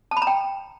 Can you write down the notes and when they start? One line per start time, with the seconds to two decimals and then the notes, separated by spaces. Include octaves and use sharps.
0.11 A5
0.17 B5
0.22 A#5
0.27 G5